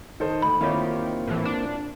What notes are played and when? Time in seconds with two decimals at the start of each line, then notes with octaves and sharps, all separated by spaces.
0.20 D#3 A4 C5 D#5
0.42 D2 B5
0.61 D#3 A#3 C4 E4 F4 G4 C#5
1.27 A2 E3
1.45 D4